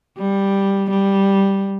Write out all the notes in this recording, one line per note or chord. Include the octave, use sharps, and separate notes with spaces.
G3
G3